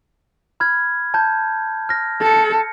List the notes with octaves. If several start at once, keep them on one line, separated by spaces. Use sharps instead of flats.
B5 F6 G#6
A5 G6
F6 A#6
A4 A6 C#7